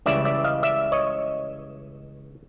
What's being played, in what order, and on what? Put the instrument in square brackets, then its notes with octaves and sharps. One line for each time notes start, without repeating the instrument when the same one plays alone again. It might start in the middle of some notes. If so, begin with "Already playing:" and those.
[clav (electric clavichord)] C#2 C#3 E3 G3 D5 E5
D5 E5
D#5 F5
D5 E5
C#5 D#5